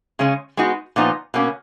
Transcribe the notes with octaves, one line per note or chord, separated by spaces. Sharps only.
C#3 G#3 C#4
G#3 B3 D#4 F#4
A#2 F3 B3 D#4
B2 A#3 C#4